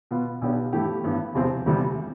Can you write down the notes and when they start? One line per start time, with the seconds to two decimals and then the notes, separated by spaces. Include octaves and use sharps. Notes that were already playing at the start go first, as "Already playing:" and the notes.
0.11 B2 B3 F4
0.42 B1 B2 B3 D4 G4
0.73 G2 E3 A3 E4 G4
1.04 A1 G2 E3 B3
1.34 E1 E2 C3 F3 C4
1.66 E1 D2 C3 E3 G3